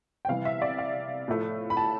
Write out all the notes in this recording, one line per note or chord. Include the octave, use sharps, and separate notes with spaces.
G5
C3 E3 G3 F5
E5
D5
F5
A2 F3 A3
B5
A5